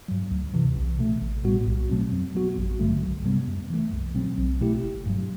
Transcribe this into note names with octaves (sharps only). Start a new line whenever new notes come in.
G2 F#3
D2
C3 E3
B1
B2 A3
A1
A2 G3 B3 F#4
B1
B2 F#3 A3 C4
F#2
F#3 B3 F#4
A1
G2 D3 F#3 A3
C2
C3 G3 B3
F#2
E3 A3
C2
B2 F#3 C4
B1
B2 A3 E4 G4
G1
G2 F#3